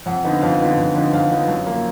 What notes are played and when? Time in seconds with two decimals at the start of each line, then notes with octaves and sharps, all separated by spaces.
0.06 F2 F#5
0.24 D3 F3 B3 D#4
0.41 F2 F5
0.60 D3 F3 B3 D#4
0.77 F2
0.95 D3 F3 B3 D#4
1.13 F2 F5
1.31 D3 F3 B3 D#4
1.48 F#2
1.66 F3 A#3